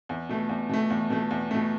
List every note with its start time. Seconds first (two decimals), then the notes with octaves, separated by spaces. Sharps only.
0.09 E2
0.29 B2 A3
0.49 E2
0.69 B2 A3
0.90 E2
1.10 B2 A3
1.31 E2
1.51 B2 A3